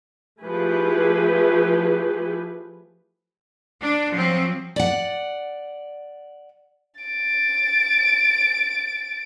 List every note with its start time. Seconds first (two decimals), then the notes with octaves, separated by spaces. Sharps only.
0.43 F3 A3 E4 G4 G#4 B4
3.81 D4
4.12 F3 F#3 C4
4.76 D5 F#5
7.01 A6 D7